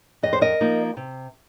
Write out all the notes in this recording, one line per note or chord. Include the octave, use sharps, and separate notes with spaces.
F2 D#5
C5
A#4 D#5
F3 A#3 D#4
C3